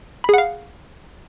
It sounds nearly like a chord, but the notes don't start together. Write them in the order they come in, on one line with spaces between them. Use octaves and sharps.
B5 G#4 F#5 F5